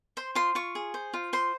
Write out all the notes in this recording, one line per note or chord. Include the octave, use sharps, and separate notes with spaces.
C5 C6
F4 C6
F4 C#6
G#4
C5
F4
C5 C6